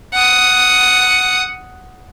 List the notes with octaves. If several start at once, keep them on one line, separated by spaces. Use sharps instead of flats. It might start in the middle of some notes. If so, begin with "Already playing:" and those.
F#5 D#6